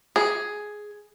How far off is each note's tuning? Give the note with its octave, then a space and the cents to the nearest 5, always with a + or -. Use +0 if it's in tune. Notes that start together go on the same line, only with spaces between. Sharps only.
G#4 +5